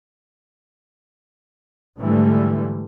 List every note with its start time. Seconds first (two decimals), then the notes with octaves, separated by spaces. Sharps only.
2.00 G#2 D3 E3 G3 A3